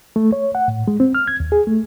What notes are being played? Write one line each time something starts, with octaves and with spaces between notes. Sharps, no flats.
A3
C#5
F#5
A2
G#3
C4
F6
G#6
D#2
G#4
A3